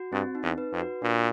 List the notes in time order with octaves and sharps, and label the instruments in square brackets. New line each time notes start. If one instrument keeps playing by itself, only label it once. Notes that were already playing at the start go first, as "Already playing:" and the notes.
Already playing: [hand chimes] F#4
[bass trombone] G2 [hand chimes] C4
[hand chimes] D#4
[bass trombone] E2
[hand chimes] B4
[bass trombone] F2
[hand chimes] F#4
[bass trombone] A#2 [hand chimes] D4